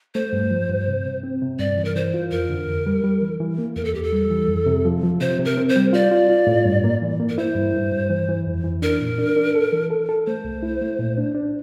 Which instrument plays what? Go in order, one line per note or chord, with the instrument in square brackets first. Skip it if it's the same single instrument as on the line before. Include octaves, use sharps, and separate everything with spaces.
[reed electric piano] A3 [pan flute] C5
[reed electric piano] G2
F3
G2
C3
C3
C4
C3
[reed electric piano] G2 [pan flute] D5
[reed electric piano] E3
[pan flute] A#4
[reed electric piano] E3 [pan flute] C5
[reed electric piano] F4
[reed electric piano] F2 [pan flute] A#4
[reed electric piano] D3
F2
G3
G3
E3
E3
A#3
[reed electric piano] E2 [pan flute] A#4
[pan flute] A4
[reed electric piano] E2 [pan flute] G4
[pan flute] A4
[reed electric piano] G3
E3
F2
C3
F3
F3
[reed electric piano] C3 [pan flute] C5
[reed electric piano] C3
[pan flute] A#4
[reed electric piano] C4
[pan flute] C5
[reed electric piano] G3
[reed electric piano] F4 [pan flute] D5
[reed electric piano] F4
F4
A2
G2
A#3
E3
A#3
[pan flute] A#4
[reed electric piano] E4 [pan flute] C5
[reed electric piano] G2
G2
G2
E3
E3
F2
E3
[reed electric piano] D4 [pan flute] A#4
[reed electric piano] A#2
D4
D4
A4
E3
A4
A4
[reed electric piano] A3 [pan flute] C5
[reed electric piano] C2
E4
A3
A#2
D4
D4